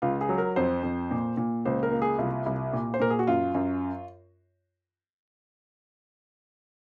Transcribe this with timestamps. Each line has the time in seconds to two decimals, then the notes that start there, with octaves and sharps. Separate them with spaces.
0.02 C#2 F4
0.21 G#4
0.29 F#3
0.38 A#4
0.56 F2 C5
0.83 F2
1.11 A#2
1.37 A#2
1.65 C#2 C5
1.83 A#4
1.92 A#3
2.02 G#4
2.19 C2 F4
2.46 C2
2.73 A#2
2.94 C5
3.00 A#2 A#4
3.10 G#4
3.19 F#4
3.27 F#2 F4
3.55 F#2